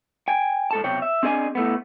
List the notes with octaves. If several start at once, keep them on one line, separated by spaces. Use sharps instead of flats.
G5 G#5
G#2 A4 A5
B1 C3 C#5 G5
E5
C4 D4 G#4 D#5 G5 G#5
A2 A3 B3